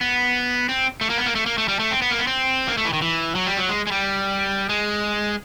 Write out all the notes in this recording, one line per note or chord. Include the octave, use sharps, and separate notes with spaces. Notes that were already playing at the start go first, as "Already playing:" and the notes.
B3
C4
A3
A#3
B3
A#3
A3
A#3
A3
G3
A3
C4
B3
A#3
B3
C4
A#3
A3
E3
D#3
E3
F#3
G3
F#3
G#3
G#3
G3
G#3